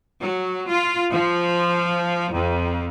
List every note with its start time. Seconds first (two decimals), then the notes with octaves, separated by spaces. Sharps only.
0.21 F#3
0.69 F4
1.13 F3
2.33 F2